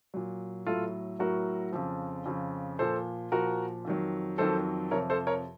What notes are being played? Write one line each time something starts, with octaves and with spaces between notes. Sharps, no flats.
A#2 F#3
A2 F#3 F4 A4
A2 F#3 F#4 A#4
F2 C#3 F3
F2 C#3 F3
A#2 F3 A4 C5
A#2 F3 F#4 A#4
F2 D#3 F#3
F2 D#3 F#3 A4 C5
F2 C3 F3 A#4 C#5
A4 C5
A#4 C#5